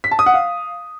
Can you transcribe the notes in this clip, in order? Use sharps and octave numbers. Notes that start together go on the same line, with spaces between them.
B6
A5
D#6
F#5
F5